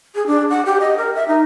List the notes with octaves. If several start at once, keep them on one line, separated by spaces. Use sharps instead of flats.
G#4
D4
F#5
G4
D#5
A#4
E5
D#4